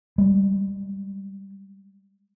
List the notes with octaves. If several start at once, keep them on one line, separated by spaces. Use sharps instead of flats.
G3 G#3